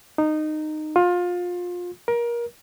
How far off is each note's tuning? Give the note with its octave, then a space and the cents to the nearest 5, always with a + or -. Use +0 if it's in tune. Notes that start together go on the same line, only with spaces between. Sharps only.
D#4 -15
F4 +25
A#4 +25